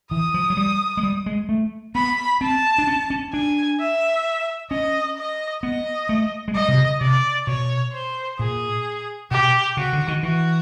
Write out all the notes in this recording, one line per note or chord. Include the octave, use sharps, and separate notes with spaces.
E3 D#6
F3
F#3
G3
G#3
G3
G#3
A3
B3 B5
C4 A5
D4
C#4
C#4
D4 G#5
E5
C#4 D#5
D#5
B3 D#5
A3
G#3
G3 D#5
C3
C#3
C3 D5
B2 C#5
C5
A#2 G#4
B2 G4
C#3 F#4
D3
D#3
E3 F#4